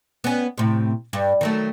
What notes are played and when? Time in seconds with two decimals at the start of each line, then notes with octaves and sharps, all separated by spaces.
0.24 B3 C#4
0.58 A2 C3
1.13 G2
1.41 D#3 F#3 A3